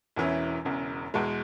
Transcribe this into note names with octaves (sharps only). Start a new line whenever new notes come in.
E1 E2 E3 C#4 E4
E1 E2 C#3
E2 B2 G#3